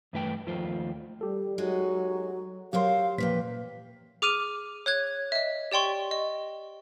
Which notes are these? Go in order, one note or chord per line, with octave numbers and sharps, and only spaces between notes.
G2 E3 A3 B4 C5 G5
D#2 D#3 F3 A3 F4 C5
G3 G4 A4
F#3 G#3 D#4 F#4
F#3 G4 A#4 C5 F5 C6
E2 A#2 F3 A#3 B4 G5 B6
G#4 D6 F6 D#7 F7
C#5 F#6 G#6
D#5 E5
G4 D5 G5 C6 C#6
D#5